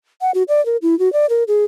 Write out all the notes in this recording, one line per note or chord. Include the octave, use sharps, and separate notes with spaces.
F#5
F#4
D5
A#4
E4
F#4
D5
A#4
G#4